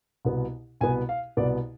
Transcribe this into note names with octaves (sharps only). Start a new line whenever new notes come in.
C2 B2 B3
C2 B2 B3 G#5
F5
C2 B2 B3 D5